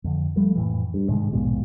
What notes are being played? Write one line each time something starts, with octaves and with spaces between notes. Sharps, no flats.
F2 D3
F3 G3 A3
F2 A2 E3
G2
G#2 C3 D#3 G#3
A#1 D#2 G#2 B2